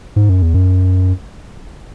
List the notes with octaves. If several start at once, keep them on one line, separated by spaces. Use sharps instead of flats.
G#2
F#2
E2
F#2